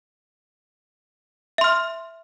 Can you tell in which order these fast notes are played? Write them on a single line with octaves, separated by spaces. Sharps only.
E5 C6 F6